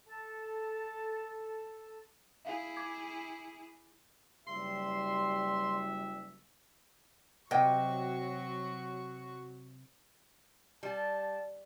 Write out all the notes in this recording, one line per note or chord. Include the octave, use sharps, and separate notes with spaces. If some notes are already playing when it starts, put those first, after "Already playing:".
A4 A5
E4 G#4 E5 F5
D6 G#6
F#1 G3 E5 C6
C3 F#3 F#4 D#5 G5 C#6
G3 A5